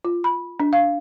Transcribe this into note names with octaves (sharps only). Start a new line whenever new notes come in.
F4
B5
D4
F5